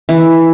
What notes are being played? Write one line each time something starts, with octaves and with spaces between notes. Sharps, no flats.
E3